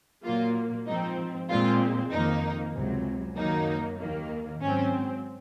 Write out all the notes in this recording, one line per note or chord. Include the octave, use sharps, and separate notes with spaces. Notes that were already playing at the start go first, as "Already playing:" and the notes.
A#2 F#3 A#3 F4
G#2 F3 C4 D#4
A#2 G#3 C4 F4
F2 D#3 A#3 D#4
C#2 C3 F#3
F#2 D#3 F#3 A#3 D#4
D#2 D#3 A#3
G#2 F#3 C4 C#4